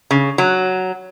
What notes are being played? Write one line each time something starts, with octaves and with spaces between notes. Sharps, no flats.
C#3
F#3